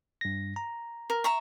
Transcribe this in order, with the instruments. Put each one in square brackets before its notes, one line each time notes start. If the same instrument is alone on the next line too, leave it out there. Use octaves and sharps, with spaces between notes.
[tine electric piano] G2 A#6
A#5
[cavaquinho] A#4
E5 A#5 C#6